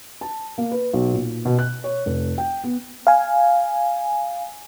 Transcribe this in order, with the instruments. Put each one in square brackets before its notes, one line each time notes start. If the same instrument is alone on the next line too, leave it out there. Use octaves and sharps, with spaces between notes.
[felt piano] A5
A#3
B4
B1
A#2
B2
F#6
C#5
F1
G5
B3
[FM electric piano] F5 G#5